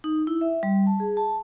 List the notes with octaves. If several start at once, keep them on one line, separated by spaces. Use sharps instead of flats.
D#4
E4
E5
G3
A5
G#4
A5